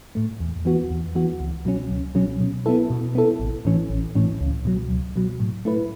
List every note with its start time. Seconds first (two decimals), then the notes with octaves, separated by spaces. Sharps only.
0.15 A2 A3
0.40 E2
0.65 E3 B3 F#4
0.90 E2
1.15 E3 B3 F#4
1.40 C#2
1.65 B2 F#3 C#4
1.91 C#2
2.15 B2 F#3 C#4
2.41 B2
2.66 B3 E4 A4
2.90 B2
3.15 B3 E4 A4
3.40 A1
3.65 A2 E3 C#4
3.90 A1
4.15 A2 E3 C#4
4.41 C#2
4.65 B2 F#3
4.90 C#2
5.16 B2 F#3
5.40 A2
5.65 A3 E4 B4